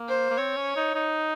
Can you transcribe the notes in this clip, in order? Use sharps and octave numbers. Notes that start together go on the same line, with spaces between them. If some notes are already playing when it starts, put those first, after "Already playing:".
Already playing: A#3
C5
A#3
C4 C#5
C#4
D#4
D#4